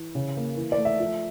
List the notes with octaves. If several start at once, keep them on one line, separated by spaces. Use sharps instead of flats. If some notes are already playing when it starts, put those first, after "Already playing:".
Already playing: E3
C#3
A#3
E3
D5
A3
E5
F3